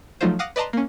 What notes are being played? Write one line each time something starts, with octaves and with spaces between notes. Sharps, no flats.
F3 F#3 A3 D#4 F4 C5
F5 F#5 D6 D#6 A#6
B4 D5 D#5 A5 A#5 C6
A#3 C#4